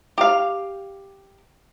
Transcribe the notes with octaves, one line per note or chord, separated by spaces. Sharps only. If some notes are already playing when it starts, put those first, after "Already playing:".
G4 F5